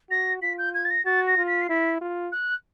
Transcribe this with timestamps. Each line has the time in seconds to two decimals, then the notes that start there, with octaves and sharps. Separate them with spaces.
0.10 F#4 A#6
0.42 F4 B6
0.58 G6
0.74 G#6
0.85 A6
0.90 A#6
1.05 F#4 A6
1.27 A#6
1.37 F4
1.47 B6
1.61 C7
1.69 E4 B6
2.01 F4
2.32 F#6